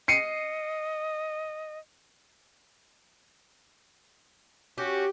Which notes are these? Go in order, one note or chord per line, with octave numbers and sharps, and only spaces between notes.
D#5 C7 C#7 D#7
C#4 F#4 G4